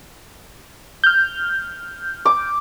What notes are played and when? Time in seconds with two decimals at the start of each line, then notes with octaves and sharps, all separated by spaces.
1.04 F6 G6
2.25 D6